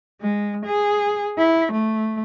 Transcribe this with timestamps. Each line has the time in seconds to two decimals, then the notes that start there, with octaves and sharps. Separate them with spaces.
0.22 G#3
0.66 G#4
1.38 E4
1.72 A3